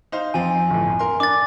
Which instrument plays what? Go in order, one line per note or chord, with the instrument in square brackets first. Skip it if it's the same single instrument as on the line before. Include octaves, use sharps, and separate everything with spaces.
[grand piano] D#4 C5 F5
[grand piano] F2 F3 C4 [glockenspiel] G#5
[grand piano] G1 A2
A#4 C6
[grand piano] D4 [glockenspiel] D6 A6